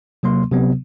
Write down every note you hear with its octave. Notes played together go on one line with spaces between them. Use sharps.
C3 F#3 A#3 C6
C3 F#3 B3